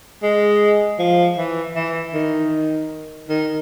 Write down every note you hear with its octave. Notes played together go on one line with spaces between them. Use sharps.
G#3
F3
E3
E3
D#3
D#3